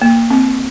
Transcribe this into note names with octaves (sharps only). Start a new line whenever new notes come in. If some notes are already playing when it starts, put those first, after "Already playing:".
A#3
C4